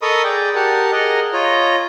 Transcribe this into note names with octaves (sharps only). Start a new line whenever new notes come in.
A4 A#4 D#5 B5 C#6 D#6
G#4 D5 G5
G4 A#4 F#5 A5
G#4 A#4 D#5 F#5
F4 C#5 D#5 A#5